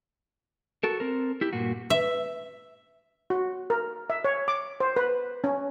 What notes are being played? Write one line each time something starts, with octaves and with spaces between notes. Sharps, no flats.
F#4 A4 A#4
C4 A#4
E4 G4
G2 A#2 A#3 F#4
E5
F#4
A#4
E5
C#5
D6
C5
B4
C#4